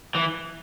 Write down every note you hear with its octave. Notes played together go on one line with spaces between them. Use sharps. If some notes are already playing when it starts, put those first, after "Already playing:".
E3